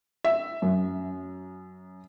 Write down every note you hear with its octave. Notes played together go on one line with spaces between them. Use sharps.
E5
F#2